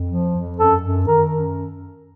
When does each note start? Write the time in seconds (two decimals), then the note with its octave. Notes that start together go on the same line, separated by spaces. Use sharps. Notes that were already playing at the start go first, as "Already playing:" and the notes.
Already playing: F2
0.08 F3
0.33 F2
0.58 F#2 A4
0.82 F#2
1.07 D#3 A#4
1.31 F#2